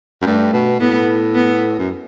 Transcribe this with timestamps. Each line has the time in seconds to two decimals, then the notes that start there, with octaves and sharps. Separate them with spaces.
0.22 F#2
0.25 G2 A3
0.53 B2
0.80 A2 B3
1.35 B3
1.79 F#2